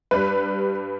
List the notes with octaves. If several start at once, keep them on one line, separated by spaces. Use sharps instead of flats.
G2 G3 B4